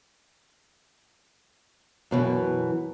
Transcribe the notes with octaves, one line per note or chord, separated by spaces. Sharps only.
F#2 B2 E3